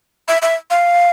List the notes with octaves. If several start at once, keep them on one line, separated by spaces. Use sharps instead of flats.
E5
E5
F5